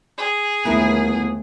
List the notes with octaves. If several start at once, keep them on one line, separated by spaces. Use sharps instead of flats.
G#4
G1 D#2 A3 B3 E4 A#4